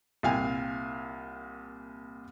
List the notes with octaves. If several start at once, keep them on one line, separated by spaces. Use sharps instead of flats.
C2 A#2 F5 G5 G#5